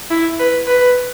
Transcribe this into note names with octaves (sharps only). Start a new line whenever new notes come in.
E4
B4
B4